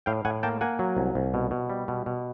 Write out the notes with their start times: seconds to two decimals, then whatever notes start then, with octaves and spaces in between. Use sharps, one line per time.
0.06 A2 F5 G5
0.25 A2 F#5 G#5
0.43 A#3 G5 A5
0.61 A#3 F#5 G#5
0.79 F#3
0.97 C2
1.15 C2
1.34 B2
1.51 B2
1.70 G3
1.88 B2
2.06 B2